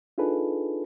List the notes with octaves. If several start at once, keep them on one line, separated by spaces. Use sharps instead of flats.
D4 D#4 F4 G#4 A4 B4